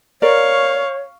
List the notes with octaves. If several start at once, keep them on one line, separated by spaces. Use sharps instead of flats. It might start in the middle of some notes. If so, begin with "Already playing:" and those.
A#4 C#5 D5 F5 C#6